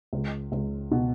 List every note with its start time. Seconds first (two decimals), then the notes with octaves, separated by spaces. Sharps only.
0.13 C#2
0.52 C#2
0.91 B2